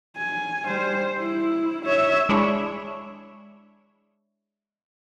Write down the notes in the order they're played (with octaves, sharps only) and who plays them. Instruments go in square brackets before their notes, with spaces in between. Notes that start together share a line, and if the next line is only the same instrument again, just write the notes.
[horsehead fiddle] G#5
G3 C5
E4
C#5 E5
[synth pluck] G#3 D4 E4 C#5